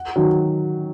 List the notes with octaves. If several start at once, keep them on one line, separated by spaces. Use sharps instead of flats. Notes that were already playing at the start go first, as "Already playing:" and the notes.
Already playing: F#5
D#3 F#3